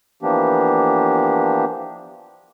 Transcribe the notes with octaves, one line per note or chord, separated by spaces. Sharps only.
E3 F3 A#3 B3 D4 G4